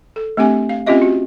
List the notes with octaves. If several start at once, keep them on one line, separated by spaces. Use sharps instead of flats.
A4
A3 C4 D4 G4 G#5
F5
C4 C#4 F4 G4 D#5 E5
F#4